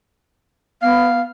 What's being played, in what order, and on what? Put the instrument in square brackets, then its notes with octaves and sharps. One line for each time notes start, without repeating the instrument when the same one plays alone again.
[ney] B3 [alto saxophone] F5